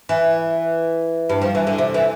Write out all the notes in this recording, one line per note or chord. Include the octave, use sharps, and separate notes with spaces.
E3
G2
F3
E3
D3
C3
E3